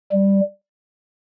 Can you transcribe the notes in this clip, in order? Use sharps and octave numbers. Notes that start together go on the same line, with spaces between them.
G3